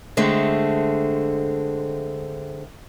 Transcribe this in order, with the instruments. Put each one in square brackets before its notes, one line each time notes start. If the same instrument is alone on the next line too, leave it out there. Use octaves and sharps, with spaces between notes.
[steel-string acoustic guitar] D3 G#3 A3 C4